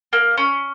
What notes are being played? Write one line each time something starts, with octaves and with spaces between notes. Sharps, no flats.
A#3
C#4